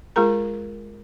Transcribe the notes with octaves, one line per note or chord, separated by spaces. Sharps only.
G#3 F4 G#4 A#4 A#5